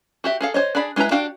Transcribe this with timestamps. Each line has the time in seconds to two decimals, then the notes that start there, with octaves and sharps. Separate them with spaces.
0.24 F#4 G4 E5
0.41 G#4 A4 F5
0.54 C5 C#5 D#5
0.75 D4 G#4 D5 B5
0.96 G#3 D#4 E4 B4 A#5
1.11 D4 F#4 G4 F5 G5